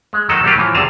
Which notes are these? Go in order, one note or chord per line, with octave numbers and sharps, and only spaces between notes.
G#3
D#3 F#3 D#4 F#4 A4
F#3 G3 A3 A#3 G4 B4
A2 E3 F3
E2 C3 G3 G#4 A5 A#5